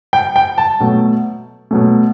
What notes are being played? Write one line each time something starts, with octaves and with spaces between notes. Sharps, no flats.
G5
G5
A5
B2 F#3 A3
B2 F#3 A3